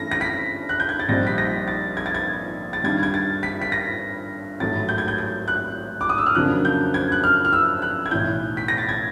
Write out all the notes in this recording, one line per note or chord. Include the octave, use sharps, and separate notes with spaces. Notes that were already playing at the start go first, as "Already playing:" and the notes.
Already playing: G2 E3 A3 C#4 A#6
A#6
B6
F#6
G6
G#6
A6
A#1 A#2 G3 C4 D#4 A#6
B6
A#6
A6
G#6
A6
G#6
A6
G2 D#3 G3 G#6
G#6
A6
B6
B6
A#6
A1 G#2 D#3 F#3 A3 A6
G6
G#6
G6
G6
F#6
D6
D#6
E6
F6
F2 C#3 F#3 A#3 D4 F#6
G6
G#6
F#6
F6
F6
E6
F#6
G#6
B1 A2 E3 G6
B6
A#6
A6
G#6